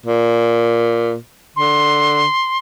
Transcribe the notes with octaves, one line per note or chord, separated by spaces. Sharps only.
A#2
D3 C6